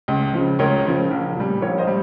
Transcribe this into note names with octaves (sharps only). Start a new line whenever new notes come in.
C#2
C#3 F3
C#2 A#4 C#5
C#3 F3
A#1
A#2 G3
A#1 A#4 C#5
C5 D#5
G3